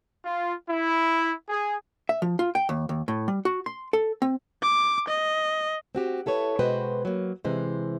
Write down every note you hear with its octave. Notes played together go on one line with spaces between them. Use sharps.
F4
E4
G#4
E5
F3
F4
G5
D#2
D#2
A2
G3
F#4
C6
A4
C4
D6
D#5
C4 F#4 G4
E4 A4 B4 C#5
B2 G#3 F#4 B4 C5 G5
F#3 A#3
C3 E3 G#3 C5